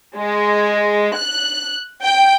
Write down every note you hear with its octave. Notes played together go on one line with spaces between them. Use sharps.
G#3
F#6
G5